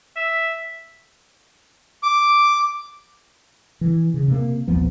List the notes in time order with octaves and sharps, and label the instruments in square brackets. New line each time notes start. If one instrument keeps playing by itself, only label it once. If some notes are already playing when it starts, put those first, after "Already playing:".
[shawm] E5
[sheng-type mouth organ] D6
[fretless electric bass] E3
C#3
C3 A#3
A#1 D#2 F3 B3